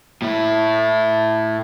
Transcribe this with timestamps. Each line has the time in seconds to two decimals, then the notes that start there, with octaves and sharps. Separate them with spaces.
0.22 A2 E4